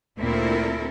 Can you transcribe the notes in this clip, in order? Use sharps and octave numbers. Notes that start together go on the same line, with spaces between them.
D2 A#2 C4 E4 A4 A#4